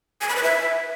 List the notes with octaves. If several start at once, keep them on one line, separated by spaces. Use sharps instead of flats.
G#5
B5
B4
E5